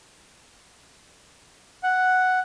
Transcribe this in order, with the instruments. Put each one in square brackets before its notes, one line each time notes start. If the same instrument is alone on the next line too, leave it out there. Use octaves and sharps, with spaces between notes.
[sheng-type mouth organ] F#5